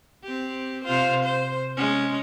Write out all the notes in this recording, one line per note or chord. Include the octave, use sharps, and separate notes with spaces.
C4 G4
C3 F4 C5
C5
G#3 C#4